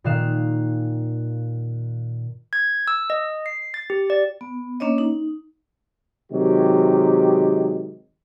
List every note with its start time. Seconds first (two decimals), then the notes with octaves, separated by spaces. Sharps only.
0.04 A#2 D#3 F5 F#6 E7
2.53 G#6
2.88 E6
3.10 D#5
3.46 C7
3.74 A6
3.90 G4
4.10 D5
4.41 B3
4.80 A#3 C#4 D4 C#5 D#5
4.98 D#4
6.32 C3 D#3 F#3 G#3 G4